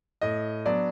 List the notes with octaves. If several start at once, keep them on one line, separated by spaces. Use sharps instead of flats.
A2 D#5
F#3 B3 D4 D5